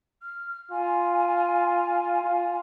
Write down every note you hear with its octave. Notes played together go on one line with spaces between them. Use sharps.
F6
F4 G#5
F4